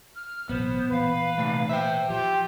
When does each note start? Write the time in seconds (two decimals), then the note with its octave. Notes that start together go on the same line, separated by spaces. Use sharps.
0.15 F6
0.49 A1 B2 F#3 B3 C5
0.91 A#2 E3 F3 B4 F5
1.38 C3 A3
1.69 C5 E5 G5
2.09 F3 F4 G4